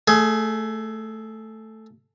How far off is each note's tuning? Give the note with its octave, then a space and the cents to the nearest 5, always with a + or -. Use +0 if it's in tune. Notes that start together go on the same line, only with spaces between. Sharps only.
A3 +0 G#4 +20